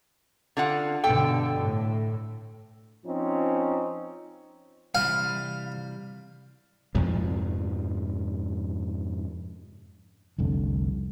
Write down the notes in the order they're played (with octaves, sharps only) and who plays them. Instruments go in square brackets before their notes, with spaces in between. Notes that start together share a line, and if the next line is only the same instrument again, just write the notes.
[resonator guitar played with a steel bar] D3 F4 F#5
[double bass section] G2 B2 D3 [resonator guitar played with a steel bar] A4 G5
[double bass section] A2
[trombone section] F3 C4 C#4 D#4
[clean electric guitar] C3 E3 G3 [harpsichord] F5
[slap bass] F2 G#2 C3 F3
[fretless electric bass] F1 C2 D3